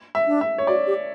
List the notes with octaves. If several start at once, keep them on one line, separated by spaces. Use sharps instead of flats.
E5
D4
E5
C#5
F#4 D5
G4